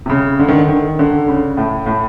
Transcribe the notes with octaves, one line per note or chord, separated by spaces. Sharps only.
C3
C#3
D3
D#3
D3
D#3
D3
C#3
A2
A2